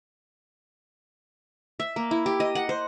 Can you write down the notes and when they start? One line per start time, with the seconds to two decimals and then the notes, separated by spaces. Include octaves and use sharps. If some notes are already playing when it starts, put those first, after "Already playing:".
1.80 E5
1.96 A#3
2.11 E4
2.26 G4
2.40 D#5
2.55 F#5
2.69 C5